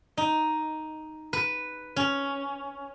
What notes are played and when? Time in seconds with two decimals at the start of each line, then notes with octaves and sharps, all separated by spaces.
0.17 D#4
1.33 B4
1.96 C#4